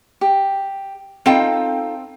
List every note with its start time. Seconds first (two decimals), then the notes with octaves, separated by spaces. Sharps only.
0.21 G4
1.26 C4 D#4 F4 A4 G5